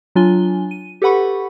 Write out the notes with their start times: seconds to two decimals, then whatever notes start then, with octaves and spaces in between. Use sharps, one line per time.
0.15 F#3 D4 F4 G#5 G7
0.71 D#7
1.02 G4 A4 B4 F#5 B5 C#6